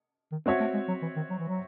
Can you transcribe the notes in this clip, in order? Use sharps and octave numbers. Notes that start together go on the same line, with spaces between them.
D#3
G#3 C4 F#4 C#5 E5
A3
G#3
F#3
E3
D#3
F#3
E3
F#3